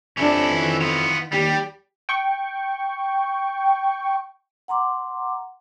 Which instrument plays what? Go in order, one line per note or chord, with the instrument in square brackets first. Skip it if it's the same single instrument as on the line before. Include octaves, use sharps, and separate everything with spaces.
[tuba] F2 [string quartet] C3 D4 [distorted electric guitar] C#4 E4
[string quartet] D#3 E3
[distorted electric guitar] B3 F4
[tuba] D#2 [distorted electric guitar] G3 [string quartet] G4
[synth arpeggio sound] G5 C#6
[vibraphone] F#5 A#5 C6 D6